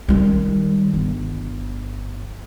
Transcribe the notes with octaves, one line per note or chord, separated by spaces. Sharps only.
D#3 G3
G1